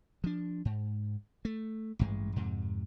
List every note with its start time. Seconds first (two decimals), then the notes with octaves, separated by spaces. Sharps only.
0.24 F3 D4
0.65 G#2
1.45 A3
1.99 A1 G2 G#3
2.36 F2 G#2 C3